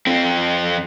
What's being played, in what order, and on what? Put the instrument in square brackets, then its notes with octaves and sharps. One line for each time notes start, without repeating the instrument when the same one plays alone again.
[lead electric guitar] F2 C4